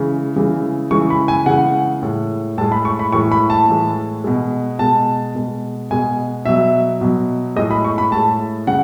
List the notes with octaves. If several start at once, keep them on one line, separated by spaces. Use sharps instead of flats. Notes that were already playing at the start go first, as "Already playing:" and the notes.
Already playing: C#3 E3 G#3
C#3 E3 G#3
C#3 E3 G#3 C#6
B5
G#5
C#3 E3 G#3 F#5
A2 G#3
A2 G#3 A5
B5
C#6
B5
A2 E3 G#3 C#6
B5
A5
A2 E3 G#3
B2 G#3
B2 G#3 A5
B2 G#3
B2 G#3 G#5
B2 F#3 E5
B2 F#3
A2 G#3 D#5
B5
C#6
B5
A2 G#3 A5
C#3 F#5